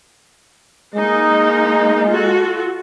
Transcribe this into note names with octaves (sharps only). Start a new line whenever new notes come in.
G#3 A#3 D#4
F4 F#4 A4